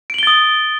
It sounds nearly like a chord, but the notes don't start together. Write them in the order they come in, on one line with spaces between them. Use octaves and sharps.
D7 F#7 G7 A6 D#6